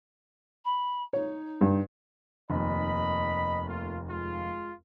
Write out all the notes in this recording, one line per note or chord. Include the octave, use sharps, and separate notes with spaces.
B5
D#4 C#5
G2
F1 D#2 D#5 B5
A3 A#3 F4
G#3 F4